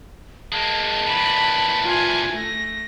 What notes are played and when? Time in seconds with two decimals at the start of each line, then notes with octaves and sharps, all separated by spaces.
0.53 G#3 A#3 A5
1.07 A#2 E3 B5
1.83 F4 G#5
2.33 A3 A#6